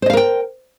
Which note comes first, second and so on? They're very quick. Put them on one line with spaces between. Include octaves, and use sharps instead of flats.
C5 D#5 F5 A#4 G5